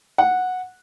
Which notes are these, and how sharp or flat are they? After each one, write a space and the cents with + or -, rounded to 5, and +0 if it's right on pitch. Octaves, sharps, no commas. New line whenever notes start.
F#5 -10